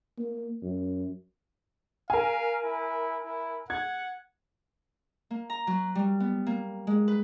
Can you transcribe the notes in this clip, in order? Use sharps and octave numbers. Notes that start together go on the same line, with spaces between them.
A#3
F#2
A#4 F5 G#5
E4
E4
F#5 G#6
A#3
A#5
F#3
G3
B3
A#3
G#3
B4